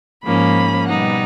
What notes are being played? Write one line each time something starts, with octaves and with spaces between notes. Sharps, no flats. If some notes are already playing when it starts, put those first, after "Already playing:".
G#2 F3 A#3 C#4 B5
B2 G3 B3 D#4 F#5